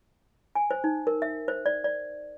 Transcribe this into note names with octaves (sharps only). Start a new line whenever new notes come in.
G#5
C5
D#4
A#4
E5
C5
D5
D5